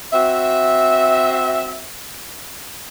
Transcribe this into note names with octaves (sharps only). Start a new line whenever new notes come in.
C4 F#4 E5